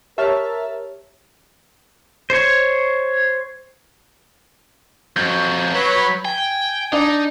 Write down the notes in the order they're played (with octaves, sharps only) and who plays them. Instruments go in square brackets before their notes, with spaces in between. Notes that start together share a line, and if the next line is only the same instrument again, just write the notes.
[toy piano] G4 C#5 [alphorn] A#4 [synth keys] E5 A5 F6
[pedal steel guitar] C5 C#5
[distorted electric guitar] F2 F#3 [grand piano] G6
[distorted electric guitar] F#3 [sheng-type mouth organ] B4 C#5 B5
[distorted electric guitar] G5 [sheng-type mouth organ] G#5
[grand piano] D4 D5 [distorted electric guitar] D#4